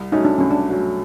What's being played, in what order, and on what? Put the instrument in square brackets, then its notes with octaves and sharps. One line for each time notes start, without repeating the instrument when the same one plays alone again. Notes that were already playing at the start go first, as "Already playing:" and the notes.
Already playing: [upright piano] C2
[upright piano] B2 F#3 A3 C#4 [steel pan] D#4
[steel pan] D4
[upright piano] C2 [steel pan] C#4
[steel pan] D4
[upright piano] B2 F#3 A3 C#4